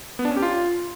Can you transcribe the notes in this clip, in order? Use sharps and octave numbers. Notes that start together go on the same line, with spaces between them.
B3
D4
C#4
G4
F4